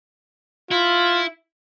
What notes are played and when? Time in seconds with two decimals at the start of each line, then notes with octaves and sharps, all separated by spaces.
0.71 E4 F4